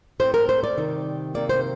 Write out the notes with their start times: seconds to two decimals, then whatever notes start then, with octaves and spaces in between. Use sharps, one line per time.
0.20 A2 A3 C4 C5
0.34 A#4
0.49 C5
0.63 D5
0.77 C3 D#3 G3
1.34 C3 D#3 A#3 D5
1.49 C5